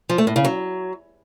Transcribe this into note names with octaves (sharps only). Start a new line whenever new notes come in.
F3
A3
A2
C#3
F#3